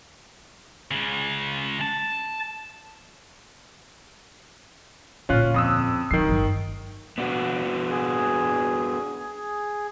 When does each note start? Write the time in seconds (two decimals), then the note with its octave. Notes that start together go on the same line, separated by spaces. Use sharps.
0.91 C#2 C#3
1.81 A5
5.29 D2 A#2 C#4 F4 F#6
5.54 F2 D#6 E6
6.11 B2 D#3 F#3 C7
6.29 G1
7.18 B3 D4 F#4
7.90 G#4